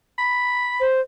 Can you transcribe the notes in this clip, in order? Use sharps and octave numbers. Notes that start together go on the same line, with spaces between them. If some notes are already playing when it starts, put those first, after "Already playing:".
B5
C5